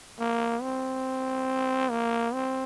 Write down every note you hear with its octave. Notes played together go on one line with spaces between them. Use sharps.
A#3
C4
A#3
C4